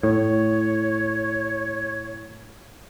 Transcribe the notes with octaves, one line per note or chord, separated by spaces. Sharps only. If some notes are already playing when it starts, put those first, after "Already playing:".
A2 C#5